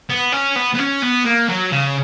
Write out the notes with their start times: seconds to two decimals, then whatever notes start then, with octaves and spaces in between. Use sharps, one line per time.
0.10 B3
0.32 C#4
0.56 B3
0.75 B3
0.79 C#4
1.02 B3
1.25 A#3
1.49 F#3
1.72 C#3